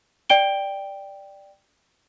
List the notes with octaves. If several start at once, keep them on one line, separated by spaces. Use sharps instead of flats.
D5 G5 D7 G7